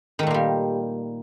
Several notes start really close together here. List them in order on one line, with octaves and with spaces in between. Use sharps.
D#3 A3 A#2 A#3 G3